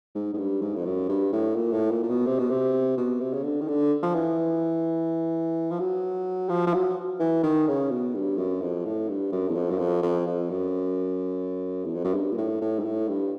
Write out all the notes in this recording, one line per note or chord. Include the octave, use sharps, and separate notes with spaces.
G#2
G#2
G2
G#2
F2
F#2
G2
A2
A#2
A2
A#2
A#2
B2
C3
B2
C3
B2
C3
C#3
D3
D#3
D3
F3
E3
F3
F#3
F3
F3
F#3
E3
D#3
C#3
B2
G2
F#2
F2
A2
G2
F#2
E2
F2
F#2
F2
F2
F2
F#2
E2
F2
F#2
G2
A#2
A2
A2
G#2
A2
G2